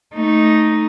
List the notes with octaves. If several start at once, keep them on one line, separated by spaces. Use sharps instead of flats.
A3 D#4